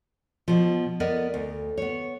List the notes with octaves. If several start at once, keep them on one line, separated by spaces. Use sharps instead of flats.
B2 F3
B3 A#4 D5 D#5
D2
B3 C#5